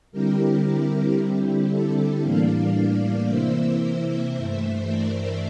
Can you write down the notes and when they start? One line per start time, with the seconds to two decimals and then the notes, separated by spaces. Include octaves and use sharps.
0.12 D3 G3 C4 E4 G4 A#4
1.18 D3 G3 C4 E4 G4
1.70 A4
2.23 A2 E3 G3 A#3 D4 D5 F5
3.29 C3 E3 A#3 E4 C5 E5
4.35 G2 E3 A3
4.88 A#4 D5